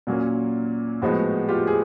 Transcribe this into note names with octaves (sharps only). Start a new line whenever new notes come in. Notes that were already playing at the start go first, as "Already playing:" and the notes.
A#2 F#3 A#3 C#4
A2 F3 G#3 B3 F#4
F4 G4
G#4